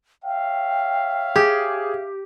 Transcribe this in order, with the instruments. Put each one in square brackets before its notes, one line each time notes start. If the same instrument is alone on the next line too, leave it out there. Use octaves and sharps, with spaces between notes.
[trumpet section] C#5 E5 F5 [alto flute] G5
[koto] G4 [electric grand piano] G#4